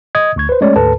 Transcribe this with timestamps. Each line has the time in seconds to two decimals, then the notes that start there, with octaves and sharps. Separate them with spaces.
0.15 D#5 D#6 G#6
0.36 D2 C#6 G#6
0.49 B4 C5
0.61 G#3 A3 C#4 C#5 D5
0.76 D2 G#2 A4 B4 A5